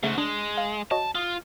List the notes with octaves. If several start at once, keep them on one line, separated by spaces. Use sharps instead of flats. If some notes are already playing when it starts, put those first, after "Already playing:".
G#2 C#3 A3 F#4
G#3 D4
F5
F#4 C#5 D#5 A5
F4 D#6